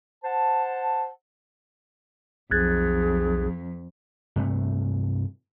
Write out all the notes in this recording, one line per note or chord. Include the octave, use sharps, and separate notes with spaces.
C5 F#5 A5
B1 F2 G#4 F#6 G#6 A6
G2 C3 A3